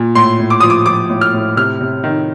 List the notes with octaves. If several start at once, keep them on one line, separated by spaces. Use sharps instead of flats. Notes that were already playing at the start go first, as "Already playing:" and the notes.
Already playing: A#2
A2 C6
A2
D6
F3 D#6
D6
F3 D6
A2
F6
A2
C3 F6
C3
D#3